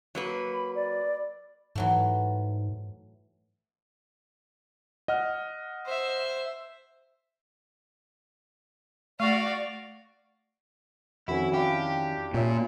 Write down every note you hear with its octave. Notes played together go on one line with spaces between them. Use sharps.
F#3 A#3 B4
B5
D5
G#2 E3 F#3 A3
D#5 F#5 F6
C5 E5
A3 F#4 D5 F5 C#6
F2 D#3 C#4 E4 F#4
D4 E4 G4 F5
A#2 C#4 E5